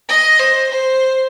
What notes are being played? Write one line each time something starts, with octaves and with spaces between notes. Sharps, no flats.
D#5
C5
C5